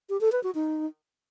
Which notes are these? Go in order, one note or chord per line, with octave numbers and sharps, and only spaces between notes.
G4
A4
B4
F#4
D#4